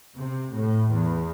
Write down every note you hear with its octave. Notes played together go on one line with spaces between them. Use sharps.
C3
A2
E2